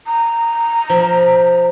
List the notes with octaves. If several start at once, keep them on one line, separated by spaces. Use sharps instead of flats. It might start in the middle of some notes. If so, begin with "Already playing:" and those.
A#5
F3